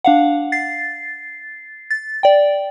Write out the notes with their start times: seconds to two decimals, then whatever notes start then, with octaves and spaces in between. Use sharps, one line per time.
0.04 D4 F5 F#5
0.52 A6 C7
1.91 A6
2.23 D5 G5